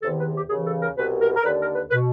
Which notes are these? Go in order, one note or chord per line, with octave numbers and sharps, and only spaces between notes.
E2 C3 D#3 A4
B4
G4
D#2 C#3 E3 G#4
A4
A#4
C2 B2 B4
A#4
A#4
D#2 D3 B4
A#4
B4
B4
B2